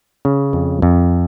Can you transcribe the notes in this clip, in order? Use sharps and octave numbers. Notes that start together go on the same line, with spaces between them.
C#3
F2
F2